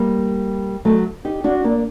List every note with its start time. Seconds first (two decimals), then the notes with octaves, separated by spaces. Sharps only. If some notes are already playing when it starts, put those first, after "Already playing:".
Already playing: G3 A#3
0.85 F#3 A3
1.25 D#4 G4
1.44 D4 F#4
1.64 A#3 D4